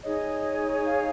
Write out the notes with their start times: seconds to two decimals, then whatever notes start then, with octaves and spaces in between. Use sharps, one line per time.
0.03 D#4 G#4 C#5 D#5
0.85 F5